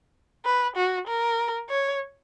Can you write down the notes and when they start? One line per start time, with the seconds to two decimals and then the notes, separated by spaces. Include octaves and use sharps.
0.45 B4
0.76 F#4
1.08 A#4
1.70 C#5